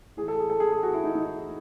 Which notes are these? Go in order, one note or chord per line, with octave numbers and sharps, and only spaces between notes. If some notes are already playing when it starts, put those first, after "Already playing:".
A2 E3 G#4
A4
G#4
A4
G#4
G#4
F#4
E4
D#4
D#4